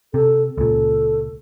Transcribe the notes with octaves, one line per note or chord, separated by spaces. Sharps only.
C3 A4
C#2 A#2 A4